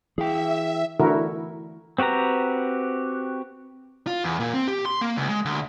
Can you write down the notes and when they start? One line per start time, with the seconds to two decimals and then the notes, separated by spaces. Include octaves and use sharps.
0.18 E3 G#4 E5 F5 G5
1.00 D3 E3 A3 E4 F#4 A#4
1.98 C4 F#4 G4 B4 A#5
4.07 F4
4.24 E2
4.40 A#2
4.54 C4
4.68 G4
4.86 C6
5.01 A#3
5.17 C#2
5.29 G#3
5.45 D2